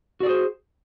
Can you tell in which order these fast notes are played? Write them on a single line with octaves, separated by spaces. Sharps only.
F#4 D5 G#4 C5